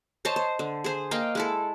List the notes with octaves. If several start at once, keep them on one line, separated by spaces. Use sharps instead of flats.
C5 C#5 D#5 A5
C5
D3
G#4 C5
A#3 D#5 F5 G5
G#3 E4 A4